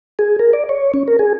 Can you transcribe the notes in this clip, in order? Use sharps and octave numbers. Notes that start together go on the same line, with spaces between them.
G#4
A#4
D5
C#5
C#4
A#4
G#4